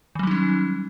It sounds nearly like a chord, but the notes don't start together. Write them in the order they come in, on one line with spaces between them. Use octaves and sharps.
D#3 F#3 G3 D#4 C#4